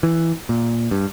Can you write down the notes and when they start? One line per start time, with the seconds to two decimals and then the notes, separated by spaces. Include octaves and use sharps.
0.03 E3
0.49 A#2
0.91 G2